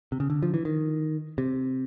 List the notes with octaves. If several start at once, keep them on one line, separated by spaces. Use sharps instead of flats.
C3
C#3
D3
F3
E3
D#3
C3